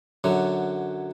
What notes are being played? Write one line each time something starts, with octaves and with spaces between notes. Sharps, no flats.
F#2 D3 F#3